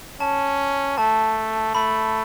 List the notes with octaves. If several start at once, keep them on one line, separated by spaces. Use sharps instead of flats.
C#4 A5
A3 A5
A3 B5